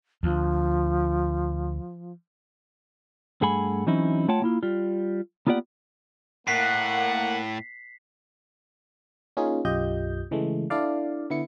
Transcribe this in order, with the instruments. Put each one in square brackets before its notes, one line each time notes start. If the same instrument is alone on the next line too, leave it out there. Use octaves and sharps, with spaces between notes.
[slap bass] D2 [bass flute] F3
[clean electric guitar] G2 A3 G#4 F#5 G#5 B5
E3 F#3 C4 C#4 D#4 E4
A3 F4 C#5 F#5 G5 A5
A#3 E4 F4
G3 F4
A#3 B3 F4 G4 D5 F#5
[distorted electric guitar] A2 [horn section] A#3 F#5 [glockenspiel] B6 C7
[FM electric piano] A#3 C#4 D#4 F4 G#4
B1 F#2 F4 G4 D#5 G6
C#3 E3 G#3 A3
D4 E4 A4 D5 F5
D3 B3 E4 C#7